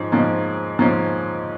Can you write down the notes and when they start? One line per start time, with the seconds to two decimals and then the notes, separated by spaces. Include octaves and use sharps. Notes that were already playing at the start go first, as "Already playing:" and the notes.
Already playing: G#2 F3 C#4
0.12 G#2 F3 A#3 C#4
0.79 G#2 F3 A#3 C#4